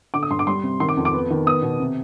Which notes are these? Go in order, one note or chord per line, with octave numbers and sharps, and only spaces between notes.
D3 D6
D#6
G2 C6
D6
G3 C6
C3
D#3 C6
D6
F2
D6
B3
D#3
B3 D#6
B2
C3